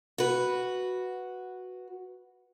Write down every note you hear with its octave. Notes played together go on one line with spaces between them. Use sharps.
F#4 B4